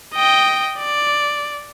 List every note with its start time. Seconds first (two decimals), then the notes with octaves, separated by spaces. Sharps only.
0.15 D#5 G5
0.78 D5